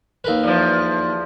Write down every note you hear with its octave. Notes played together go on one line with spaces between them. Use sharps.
D#2 A#4 B4
E2 F3